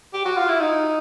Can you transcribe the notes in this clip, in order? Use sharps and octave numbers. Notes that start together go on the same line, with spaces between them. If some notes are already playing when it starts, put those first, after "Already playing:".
G4
F#4
F4
E4
D#4